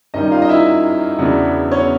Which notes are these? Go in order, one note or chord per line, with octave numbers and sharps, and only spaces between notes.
F#2 D#3 G3 D#4 D#5
F4 F5
D#5
E4 E5
E2 C#3 F#3 B3 D4
C#4 C#5